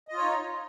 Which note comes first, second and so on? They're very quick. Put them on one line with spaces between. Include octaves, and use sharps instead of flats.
D#5 F4 C#5 D#4